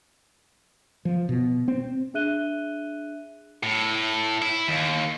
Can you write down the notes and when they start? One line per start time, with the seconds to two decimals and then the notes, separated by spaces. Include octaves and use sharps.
1.05 F3
1.29 B2
1.68 C4
2.14 D4 G#4 E5 F#6 D#7 G7
3.63 A2
4.42 E4
4.68 D#2